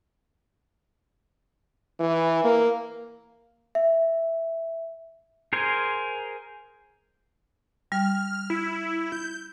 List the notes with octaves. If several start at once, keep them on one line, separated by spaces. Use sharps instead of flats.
E3
A#3
E5
G#4 A#4 C5 G#5
G3 F6
E4
G6